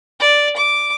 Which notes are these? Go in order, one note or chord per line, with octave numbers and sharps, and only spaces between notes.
D5
D6